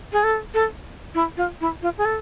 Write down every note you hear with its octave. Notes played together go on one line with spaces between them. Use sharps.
G#4
A4
A4
E4
F4
E4
F4
G#4
A4